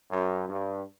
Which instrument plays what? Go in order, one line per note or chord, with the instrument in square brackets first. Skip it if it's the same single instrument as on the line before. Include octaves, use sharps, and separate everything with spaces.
[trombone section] F#2
G2